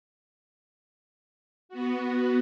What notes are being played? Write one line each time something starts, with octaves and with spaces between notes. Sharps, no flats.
B3 F#4